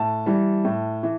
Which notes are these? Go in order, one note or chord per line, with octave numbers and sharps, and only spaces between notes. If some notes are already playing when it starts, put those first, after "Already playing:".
Already playing: A2 A5
E3 G3
A2
E3